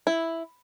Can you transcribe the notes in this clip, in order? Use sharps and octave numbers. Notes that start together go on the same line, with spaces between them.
E4